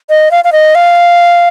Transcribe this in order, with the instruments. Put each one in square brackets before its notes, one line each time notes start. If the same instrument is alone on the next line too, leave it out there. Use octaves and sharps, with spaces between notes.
[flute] D#5
F5
F5
D#5
F5